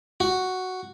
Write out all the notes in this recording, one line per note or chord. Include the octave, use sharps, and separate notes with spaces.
F#4